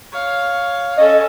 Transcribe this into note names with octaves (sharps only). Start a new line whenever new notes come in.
C#5 F5
C#4 A4 D#5